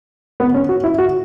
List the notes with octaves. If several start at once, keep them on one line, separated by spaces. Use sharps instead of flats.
B3
C#4
F#4
E4
F#4